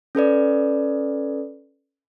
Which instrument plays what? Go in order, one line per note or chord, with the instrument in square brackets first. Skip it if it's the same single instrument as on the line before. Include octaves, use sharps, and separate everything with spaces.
[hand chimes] C#4 A4 B4 D5